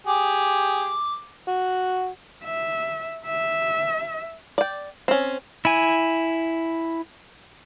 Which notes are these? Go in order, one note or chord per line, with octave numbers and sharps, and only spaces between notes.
G4 G#4 D6
F#4
E5
E5
D5 G5
C4 C#4
E4 G#5